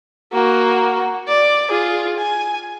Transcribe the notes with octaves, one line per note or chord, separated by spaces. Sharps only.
A#3 F#4
D5
F4 G#4
G#5